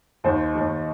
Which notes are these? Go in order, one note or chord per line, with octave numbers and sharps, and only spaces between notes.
D#2 D#3 C5
D#2 D#3